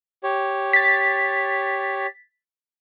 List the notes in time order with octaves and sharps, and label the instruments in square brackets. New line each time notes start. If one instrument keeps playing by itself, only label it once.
[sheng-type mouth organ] G4 C#5
[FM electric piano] A6 B6